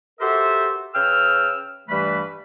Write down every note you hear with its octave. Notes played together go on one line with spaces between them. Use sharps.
F#4 G4 A4 A#4 C5 E5
C#3 B4 G5 E6 F6
G2 E3 G3 A3 B4 B5